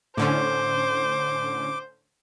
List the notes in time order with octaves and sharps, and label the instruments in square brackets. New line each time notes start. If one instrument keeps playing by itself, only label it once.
[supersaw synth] A2 D3 C#4 [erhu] C5 [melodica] D6